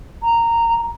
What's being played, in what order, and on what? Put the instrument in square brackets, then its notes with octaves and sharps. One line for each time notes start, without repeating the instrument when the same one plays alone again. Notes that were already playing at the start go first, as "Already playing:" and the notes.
[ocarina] A#5